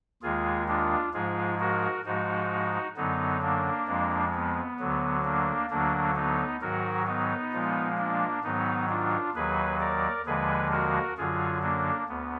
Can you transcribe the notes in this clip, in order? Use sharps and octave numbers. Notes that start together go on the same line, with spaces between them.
D#2 D#3 G#3 F4 G#4
D4 F4
G#2 F3 G#3 F4 G#4
F#4 A#4
G#2 F3 G#3 D#4 F#4
F#2 D3 F#3 B3 D#4
A#3 D4
F2 F3 G#3
B3
D2 D3 F#3
A#3 D4
D2 D3 F#3 A#3 D4
B3 D#4
G#2 D#3 F#3 F#4 A#4
B3 D#4
A#2 F3 G#3
A#3 D4
G#2 D#3 F#3 B3 D#4
D4 F4
D#2 D#3 F#3 G#4 B4
A#4 D5
D#2 D3 F3 G#3 G#4 B4
F#4 A#4
F#2 D3 F#3 F4 G#4
A#3 D4
D2 B3